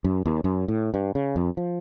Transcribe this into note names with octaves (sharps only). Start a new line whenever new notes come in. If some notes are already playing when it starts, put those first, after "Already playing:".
F#2
D#2
F#2
A2
G2
C#3
F2
F3